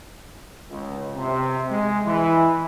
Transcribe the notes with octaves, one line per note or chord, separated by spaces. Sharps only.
C#2
C3
G#3
E3